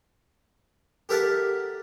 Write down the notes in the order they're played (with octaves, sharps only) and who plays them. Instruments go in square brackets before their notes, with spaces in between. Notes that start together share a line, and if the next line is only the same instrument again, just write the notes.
[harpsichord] G4 A4 A#4 E5 F#5 A5